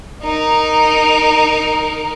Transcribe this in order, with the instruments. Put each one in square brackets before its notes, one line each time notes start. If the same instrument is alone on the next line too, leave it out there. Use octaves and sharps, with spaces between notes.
[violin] D#4 A#4